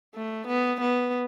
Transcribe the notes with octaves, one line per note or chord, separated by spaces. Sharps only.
A3
B3
B3